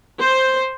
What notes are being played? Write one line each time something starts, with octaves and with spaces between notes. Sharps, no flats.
C5